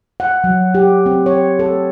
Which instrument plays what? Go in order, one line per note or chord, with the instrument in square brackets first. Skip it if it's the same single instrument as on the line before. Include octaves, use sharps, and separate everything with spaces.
[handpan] F#5
F#3
G4
C4
C#5
A4